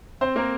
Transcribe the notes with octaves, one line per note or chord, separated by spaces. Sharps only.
C4 C5
A#3 A#4